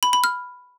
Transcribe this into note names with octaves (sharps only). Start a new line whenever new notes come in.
B5
B5
F6